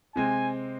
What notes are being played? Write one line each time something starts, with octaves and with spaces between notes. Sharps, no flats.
C3 G#3 C4 G#5